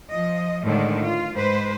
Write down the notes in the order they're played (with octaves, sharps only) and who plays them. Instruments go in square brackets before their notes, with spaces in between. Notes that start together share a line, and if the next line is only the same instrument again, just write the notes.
[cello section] F3 D#5
A2 D3 D#3 G#3
F4
G#2 B4 C5